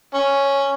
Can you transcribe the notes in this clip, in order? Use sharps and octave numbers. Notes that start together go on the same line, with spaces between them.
C#4